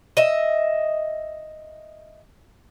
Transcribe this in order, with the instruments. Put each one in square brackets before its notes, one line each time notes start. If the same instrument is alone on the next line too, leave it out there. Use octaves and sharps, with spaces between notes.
[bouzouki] D#5 E5